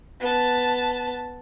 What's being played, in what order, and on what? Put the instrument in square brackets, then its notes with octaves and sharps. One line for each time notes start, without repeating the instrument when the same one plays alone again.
[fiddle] B3 A5